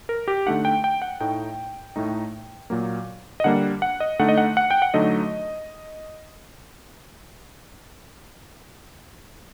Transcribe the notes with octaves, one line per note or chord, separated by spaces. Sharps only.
A#4
G4
D3 A3 D#4 F#5
G5
G5
F#5
A2 A3 D#4 G5
A2 A3 D#4
A#2 F#3 A#3
D#5
D3 G3 A#3 D4 F#5
F#5
D#5
D3 A3 D#4 F#5
D#5
F#5
F#5
G5
F#5
D3 F#3 A3 D#4 D#5